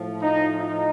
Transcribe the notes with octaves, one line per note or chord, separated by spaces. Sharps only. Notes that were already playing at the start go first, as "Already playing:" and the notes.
Already playing: A2 F3
D#4
D#4